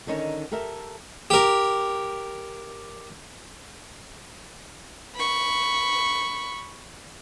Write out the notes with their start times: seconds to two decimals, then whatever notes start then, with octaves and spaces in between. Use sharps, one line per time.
0.07 D3 D#3 C#4 D#4 C#5
0.51 G4 A4 A#4 E5
1.30 G4 A#4
5.15 B5 C#6